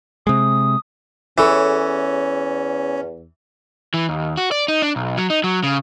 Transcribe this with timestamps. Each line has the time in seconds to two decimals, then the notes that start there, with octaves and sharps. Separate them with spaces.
0.27 C3 G#3 D#6
1.38 E2 E3 C#4 G#4 A4 C#5
3.94 E3
4.09 D#2
4.37 F#4
4.51 D5
4.68 D#4
4.82 D4
4.96 B1
5.17 F#3
5.30 D#4
5.44 F#3
5.64 C#3